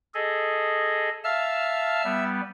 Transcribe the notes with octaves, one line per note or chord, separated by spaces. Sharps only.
G#4 A4 D#5
E5 F5 A5 F6
G3 B3